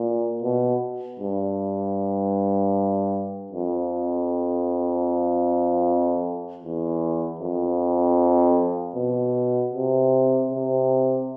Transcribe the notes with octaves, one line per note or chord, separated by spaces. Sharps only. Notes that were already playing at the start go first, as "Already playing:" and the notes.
Already playing: A#2
B2
G2
F2
E2
F2
B2
C3
C3